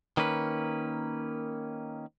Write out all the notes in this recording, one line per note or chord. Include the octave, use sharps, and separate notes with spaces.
D#3 A#3 C#4 B4